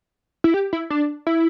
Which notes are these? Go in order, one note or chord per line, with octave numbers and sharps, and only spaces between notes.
E4
G4
E4
D4
E4